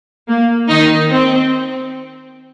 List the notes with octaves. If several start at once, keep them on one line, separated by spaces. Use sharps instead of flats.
A#3
D#3 D#4
C4